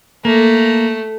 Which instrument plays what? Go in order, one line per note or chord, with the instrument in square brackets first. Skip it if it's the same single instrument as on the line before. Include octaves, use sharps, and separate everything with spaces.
[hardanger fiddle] A3 [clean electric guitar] A#3